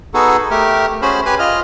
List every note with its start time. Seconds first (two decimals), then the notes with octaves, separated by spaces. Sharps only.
0.14 B3 D#4 F#4 G#4 A4
0.51 A3 G4 A#4
1.02 C#4 F#4 G#4 C5 B5
1.25 G4 B4 G#5
1.39 F4 D#5 F6